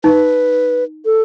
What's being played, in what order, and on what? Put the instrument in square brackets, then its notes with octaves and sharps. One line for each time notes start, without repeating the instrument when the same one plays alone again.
[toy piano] D#4 [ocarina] B4
[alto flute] A4